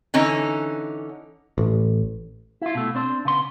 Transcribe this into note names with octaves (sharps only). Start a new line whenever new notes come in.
D3 E3 C#4 D#4
A1
E4 F4
B2 A3
C4 D4 C5
C#3 B3 C6